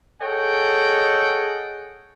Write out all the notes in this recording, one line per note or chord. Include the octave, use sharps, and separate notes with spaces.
G#4 A4 C#5 D#5 F#5 G5